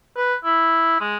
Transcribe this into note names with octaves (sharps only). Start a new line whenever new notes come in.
B4
E4
G#3